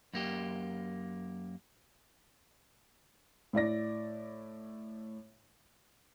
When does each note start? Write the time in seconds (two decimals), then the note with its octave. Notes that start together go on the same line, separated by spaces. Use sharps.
0.13 F#2 A#3 G4
3.53 A2 E4 D5 A#6